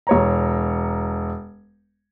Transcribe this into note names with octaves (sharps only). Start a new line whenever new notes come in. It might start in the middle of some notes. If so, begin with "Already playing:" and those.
E1 C#5 A#5